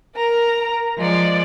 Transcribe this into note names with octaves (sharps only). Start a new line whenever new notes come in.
A#4 A#5
F3 G#3 D5